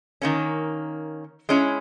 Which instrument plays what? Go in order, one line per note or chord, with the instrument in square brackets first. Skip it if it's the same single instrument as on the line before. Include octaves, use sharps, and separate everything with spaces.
[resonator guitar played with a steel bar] D#3 A#3 C#4
G#3 C#4 E4